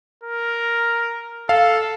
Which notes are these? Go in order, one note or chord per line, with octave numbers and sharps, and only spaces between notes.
A#4
A4 F5